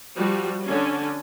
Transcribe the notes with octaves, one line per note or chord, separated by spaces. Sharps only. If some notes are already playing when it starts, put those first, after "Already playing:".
F3 G3 F#4
D3 C#4